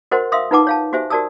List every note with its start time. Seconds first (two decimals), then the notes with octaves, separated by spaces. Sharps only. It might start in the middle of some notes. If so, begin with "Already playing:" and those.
0.11 F#4 A#4 C5 D#5 F#5 C6
0.32 E5 F5 C6 D#6 E6
0.51 D#4 F4 B4 F#5 A5 D6
0.67 C#5 F5 A5
0.93 F#4 G4 C5 E5 G#5
1.10 F#4 A#4 D5 A5 D#6 E6